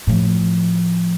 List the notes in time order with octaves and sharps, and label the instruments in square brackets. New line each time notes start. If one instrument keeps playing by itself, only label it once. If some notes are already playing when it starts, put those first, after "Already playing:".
[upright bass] A2 F3